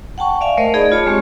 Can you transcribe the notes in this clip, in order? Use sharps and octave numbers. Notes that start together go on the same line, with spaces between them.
F#5 G5 A5 C#6
D5 E5 F5 G#5 C#6
A3 A#4 C5 D#5
D#4 G#4 D5 D#5 B5
F4 C#5 A5 D6
G#3 C4 G4 C#6